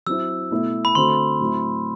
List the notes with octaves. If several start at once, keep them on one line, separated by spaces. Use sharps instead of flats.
F#3 C4 E4 E6
B2 A3 E4
B5
D3 A3 C4 F#4 C6
A2 F#3 C4 E4